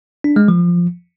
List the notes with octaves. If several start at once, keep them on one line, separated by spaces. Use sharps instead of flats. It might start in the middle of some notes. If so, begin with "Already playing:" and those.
D4
G#3
F3